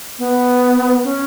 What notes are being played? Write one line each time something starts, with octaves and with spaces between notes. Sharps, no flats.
B3
C#4